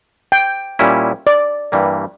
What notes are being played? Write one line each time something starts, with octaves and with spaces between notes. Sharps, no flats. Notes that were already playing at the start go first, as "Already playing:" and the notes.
G5
A#2 G3 C#4 E4
D5
G2 E3 G3 A#3